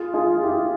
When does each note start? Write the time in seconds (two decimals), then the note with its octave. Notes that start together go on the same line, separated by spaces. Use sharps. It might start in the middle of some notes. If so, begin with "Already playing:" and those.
Already playing: F4 G#4
0.14 F4 G#4
0.43 E4 G4